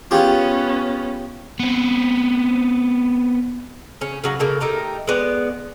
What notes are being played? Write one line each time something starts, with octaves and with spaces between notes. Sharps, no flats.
B3 C#4 F4 G4 G#4
B3 C4
C#3 C#4
C#3 F#3 F#5
C#3 A#3 A4
A3 D#4 G4 A#4
G#3 B3 D5